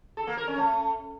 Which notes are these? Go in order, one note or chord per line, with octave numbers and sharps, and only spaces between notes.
A4
A#3
A#4
C#4
A3